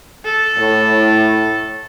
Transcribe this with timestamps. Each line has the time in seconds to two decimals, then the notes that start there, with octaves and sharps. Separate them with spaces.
0.25 A4
0.57 A2